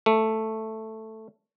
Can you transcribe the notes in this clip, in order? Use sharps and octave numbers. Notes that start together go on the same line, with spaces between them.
A3